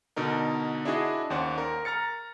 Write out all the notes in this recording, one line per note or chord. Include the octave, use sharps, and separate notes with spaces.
B2 D3 D#4 A#4
D4 E4 F#4 G#4 D5 D#5
D#2 C#4 C5 D5 F#5
A#4
A#5 F6 A6 C#7